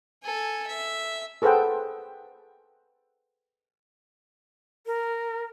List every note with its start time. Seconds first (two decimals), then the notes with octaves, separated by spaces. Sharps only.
0.23 A4 G#5
0.67 E5
1.42 G#4 A4 B4 C5 F#5 G5
4.86 A#4